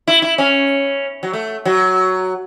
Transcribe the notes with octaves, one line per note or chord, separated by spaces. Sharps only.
E4
E4
C#4
F#3
A3
F#3